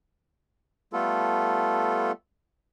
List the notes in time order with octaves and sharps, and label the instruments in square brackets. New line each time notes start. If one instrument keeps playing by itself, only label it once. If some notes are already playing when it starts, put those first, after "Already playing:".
[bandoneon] G3 A3 B3 F4 A4